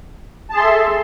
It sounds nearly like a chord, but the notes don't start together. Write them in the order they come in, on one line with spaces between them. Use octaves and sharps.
A5 G#4 C6 E5 A4